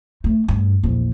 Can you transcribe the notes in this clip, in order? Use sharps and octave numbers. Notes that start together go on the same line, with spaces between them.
A3
G2
A#1 E2